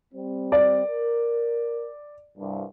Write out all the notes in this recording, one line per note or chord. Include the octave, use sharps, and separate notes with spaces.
G3 C4
D5
A#4
C2 G2